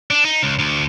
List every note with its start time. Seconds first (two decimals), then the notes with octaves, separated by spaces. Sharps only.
0.10 D4
0.25 D#4
0.43 C#2
0.59 D2